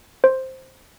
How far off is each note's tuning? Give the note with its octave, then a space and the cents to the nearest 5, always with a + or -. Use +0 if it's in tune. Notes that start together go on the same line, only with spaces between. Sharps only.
C5 +5